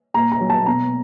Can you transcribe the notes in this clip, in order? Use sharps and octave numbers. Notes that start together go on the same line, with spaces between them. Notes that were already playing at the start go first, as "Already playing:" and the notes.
A#2 A#5
A#5
F#3
A5
B2 A#5